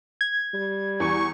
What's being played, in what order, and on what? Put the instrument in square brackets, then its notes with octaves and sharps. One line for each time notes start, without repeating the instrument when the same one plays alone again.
[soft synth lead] G#6
[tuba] G3
[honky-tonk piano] E2 [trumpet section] C#6